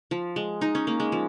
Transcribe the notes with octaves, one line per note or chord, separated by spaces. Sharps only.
F3
G#3
D#4
C#4
A#3
G#3
F3